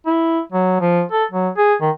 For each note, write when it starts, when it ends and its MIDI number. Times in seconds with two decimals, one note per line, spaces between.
0.06 0.41 64
0.52 0.77 54
0.81 1.02 53
1.12 1.25 69
1.31 1.49 54
1.58 1.74 68
1.81 1.90 51